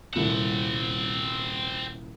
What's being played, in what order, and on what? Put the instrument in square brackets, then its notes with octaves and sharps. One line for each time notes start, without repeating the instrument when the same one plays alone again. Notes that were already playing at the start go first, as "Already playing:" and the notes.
[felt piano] D#1 C2 E7 [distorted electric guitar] C4 F#5